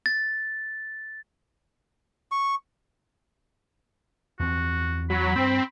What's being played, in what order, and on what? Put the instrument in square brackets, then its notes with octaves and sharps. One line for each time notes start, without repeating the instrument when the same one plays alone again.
[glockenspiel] A6
[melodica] C#6
[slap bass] E2 C4 [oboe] F#4
[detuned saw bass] F#3 [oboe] B5
[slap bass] G2 [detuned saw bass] C4